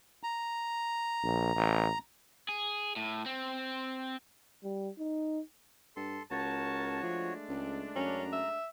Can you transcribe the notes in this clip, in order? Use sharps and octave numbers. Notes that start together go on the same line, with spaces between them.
A#5
A#1
A1
G#4
A2
C4
G3
D#4
G2 A4 C6
C#2 F#4 A#4 C#5 A5
F3 G#3 A3 D4
C#2
F#2 C#4 A#5
E5